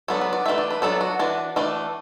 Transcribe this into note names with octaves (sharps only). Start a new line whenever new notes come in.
F#3 B3 D4 A4
B4
D5
E3 A3 D4 E5
D5
B4
F#3 B3 D4 A4
F#4
E3 D4
E3 A3 D4